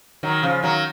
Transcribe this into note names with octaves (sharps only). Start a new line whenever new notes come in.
D#3 F#3
C#3 F3
D#3 F#3